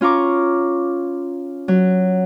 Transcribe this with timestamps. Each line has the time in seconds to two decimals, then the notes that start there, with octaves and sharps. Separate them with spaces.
0.01 C#4 F4 A#5 C#6 D6
1.68 F#3